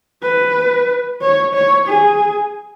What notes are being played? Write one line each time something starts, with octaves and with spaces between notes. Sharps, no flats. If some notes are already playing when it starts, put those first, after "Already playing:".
B4
C#5
C#5
G#4